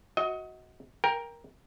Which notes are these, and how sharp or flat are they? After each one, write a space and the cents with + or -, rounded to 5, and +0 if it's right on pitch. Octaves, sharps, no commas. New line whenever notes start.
F#4 +0 D#5 +30
A#4 +5 G5 +20